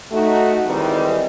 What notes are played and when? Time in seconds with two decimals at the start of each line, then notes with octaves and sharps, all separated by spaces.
0.12 A3 D#4 F#4
0.66 D#3 E3 G3 G#3 C4 D#4